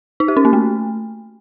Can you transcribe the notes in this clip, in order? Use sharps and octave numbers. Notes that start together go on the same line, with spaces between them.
D#4
G4
C#4
A#3
A3